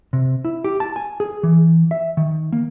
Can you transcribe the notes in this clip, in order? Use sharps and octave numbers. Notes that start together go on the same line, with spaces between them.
C3
E4
G4
A5
G#5
G#4
E3
E5
D#3
A#3